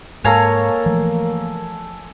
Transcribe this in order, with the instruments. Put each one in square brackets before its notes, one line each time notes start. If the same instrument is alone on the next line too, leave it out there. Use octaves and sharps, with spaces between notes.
[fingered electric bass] G#2 [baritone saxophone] A#3 [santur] A4 G#5 [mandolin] C#5 F5 A#5
[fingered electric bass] E3 F3 A3